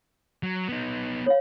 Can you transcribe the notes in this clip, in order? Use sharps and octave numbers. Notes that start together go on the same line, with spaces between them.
F#3
B3 D#4
C#5 F5